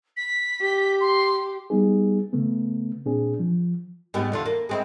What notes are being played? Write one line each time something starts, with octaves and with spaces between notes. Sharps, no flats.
B6
G4
C6
G3 B3 D#4 G#4
C#3 A3 B3
A#2 C4 D4 G#4
F3
G#2 G3 B3
E2 D3 F4
A#3
G#3 C4 E4